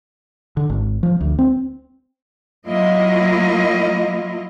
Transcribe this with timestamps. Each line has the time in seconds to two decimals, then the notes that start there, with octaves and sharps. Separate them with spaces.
0.57 D3
0.70 G#1
1.03 F3
1.21 D2
1.39 C4
2.66 F#3 A#3 E4 F4 D#5